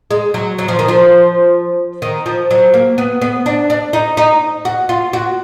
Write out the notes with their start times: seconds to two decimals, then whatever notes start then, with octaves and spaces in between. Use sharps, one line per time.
0.11 G#3
0.34 F#3
0.58 F#3
0.68 F3
0.79 D#3
0.88 F3
2.02 D#3
2.26 F3
2.51 F#3
2.74 A#3
2.98 B3
3.21 B3
3.46 D4
3.70 D4
3.93 D#4
4.17 D#4
4.65 F#4
4.89 F4
5.13 F#4